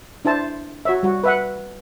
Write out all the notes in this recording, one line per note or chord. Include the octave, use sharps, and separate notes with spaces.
D4 E4 C5 A5
F#4 C#5 E5
G3 F#4
B4 E5 F#5